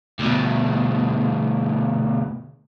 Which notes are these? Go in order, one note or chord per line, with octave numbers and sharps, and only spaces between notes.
D2 B2